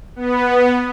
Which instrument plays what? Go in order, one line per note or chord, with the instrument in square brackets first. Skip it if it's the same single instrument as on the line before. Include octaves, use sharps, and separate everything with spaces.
[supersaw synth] B3